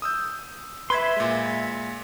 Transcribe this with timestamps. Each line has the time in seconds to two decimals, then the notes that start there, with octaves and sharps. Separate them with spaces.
0.02 D#6 E6 G6
0.90 B4 E5 B5 C6 G#6
1.17 A#2 G#3